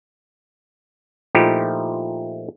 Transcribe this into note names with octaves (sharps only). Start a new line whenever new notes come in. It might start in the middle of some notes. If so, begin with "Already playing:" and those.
A#2 F3 A3 D#4 E4 G4